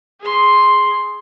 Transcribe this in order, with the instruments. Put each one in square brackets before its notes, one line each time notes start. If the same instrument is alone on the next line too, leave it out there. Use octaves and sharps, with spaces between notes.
[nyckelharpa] G#4 C6